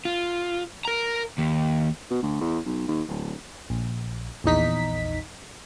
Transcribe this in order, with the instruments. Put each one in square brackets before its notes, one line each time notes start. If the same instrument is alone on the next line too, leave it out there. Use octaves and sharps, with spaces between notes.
[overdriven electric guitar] F4
A#4 A#5
D#2
[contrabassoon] B2
D2
E2
B1
D#2
D1
[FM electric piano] A#1
A#1 E2 D#4 B6